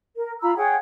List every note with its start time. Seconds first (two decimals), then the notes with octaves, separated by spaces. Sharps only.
0.16 A#4
0.42 F4 A#5 B5 E6
0.57 G#4 C#5 F#5 G5